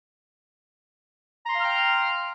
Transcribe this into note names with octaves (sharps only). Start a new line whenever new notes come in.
F5 G5 A#5 C6 F6